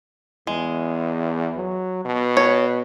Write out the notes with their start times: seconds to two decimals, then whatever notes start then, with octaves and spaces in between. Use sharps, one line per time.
0.47 E2 G#3
1.57 F#3
2.05 B2
2.37 C#5